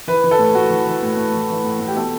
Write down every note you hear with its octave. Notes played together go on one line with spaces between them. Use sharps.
E3 B4
E3
A4
A2
A2 F#4
E3
E3
A2
A2
E3
E3
A2
A2
G4
B2 A4